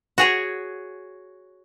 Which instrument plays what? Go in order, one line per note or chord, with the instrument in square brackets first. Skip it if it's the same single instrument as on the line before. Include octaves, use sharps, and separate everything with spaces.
[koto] F#4 G#4 C#5